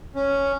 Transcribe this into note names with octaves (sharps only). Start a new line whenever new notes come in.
C#4